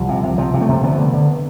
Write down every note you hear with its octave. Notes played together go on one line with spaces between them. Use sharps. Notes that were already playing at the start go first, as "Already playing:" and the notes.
Already playing: C2 F3
C3
C3
C3 F3
C3
A3
C3
D3 B3
D3
D3